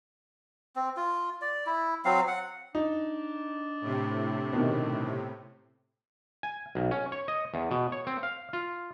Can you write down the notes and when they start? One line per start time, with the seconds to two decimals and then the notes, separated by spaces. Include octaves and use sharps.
0.76 C4
0.97 F4
1.42 D5
1.66 E4
2.05 F#3 C4 F5
2.28 F#5
2.75 D4 D#4
3.81 A2 C3
4.53 B2 D#3
6.43 G#5
6.75 B1
6.91 C#4
7.12 C#5
7.28 D#5
7.54 E2
7.71 B2
7.92 C#5
8.07 C4
8.23 F5
8.53 F4